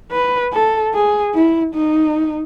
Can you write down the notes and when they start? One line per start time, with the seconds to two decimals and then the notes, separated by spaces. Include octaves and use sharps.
0.12 B4
0.53 A4
0.93 G#4
1.34 E4
1.75 D#4